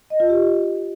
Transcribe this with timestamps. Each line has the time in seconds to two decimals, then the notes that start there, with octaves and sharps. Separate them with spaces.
0.10 D#5
0.20 F4
0.30 G4